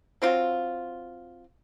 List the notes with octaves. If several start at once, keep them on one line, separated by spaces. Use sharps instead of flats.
F#3 C4 F4